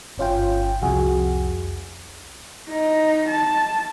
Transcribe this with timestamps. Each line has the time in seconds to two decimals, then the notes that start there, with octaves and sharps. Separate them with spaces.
0.18 G1 C#4 F4 G5
0.82 C2 F2 F#4 G#4
2.69 D#4
3.29 A5